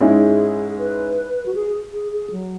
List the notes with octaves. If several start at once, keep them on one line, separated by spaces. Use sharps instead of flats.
G#2 G#3 C#4 E4 G#4
B4
F#4
G#4
G#4
G#4
F#3